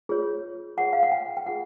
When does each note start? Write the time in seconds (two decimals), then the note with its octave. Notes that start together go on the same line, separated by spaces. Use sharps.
0.09 F4 G#4 C#5
0.77 F4 G#4 C#5 F#5
0.93 F5
1.03 F#5
1.12 G5
1.37 G5
1.46 F4 G#4 F#5